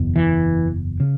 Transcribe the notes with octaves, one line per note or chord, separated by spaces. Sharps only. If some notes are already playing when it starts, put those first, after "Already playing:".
Already playing: F#1 E2 B2
E3
C#3